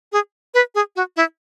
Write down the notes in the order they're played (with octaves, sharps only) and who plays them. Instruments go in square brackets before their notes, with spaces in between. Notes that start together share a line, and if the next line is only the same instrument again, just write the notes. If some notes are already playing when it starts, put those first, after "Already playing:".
[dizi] G#4
B4
G#4
F#4
E4